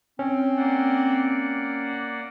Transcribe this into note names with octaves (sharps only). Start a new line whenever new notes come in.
C4 C#4
A#3 D5 F#5